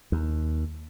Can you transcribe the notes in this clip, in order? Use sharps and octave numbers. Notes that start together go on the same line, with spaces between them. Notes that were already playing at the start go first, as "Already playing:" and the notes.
D#2